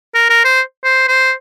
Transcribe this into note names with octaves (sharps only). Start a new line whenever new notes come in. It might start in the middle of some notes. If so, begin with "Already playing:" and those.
A#4
A#4
C5
C5
C5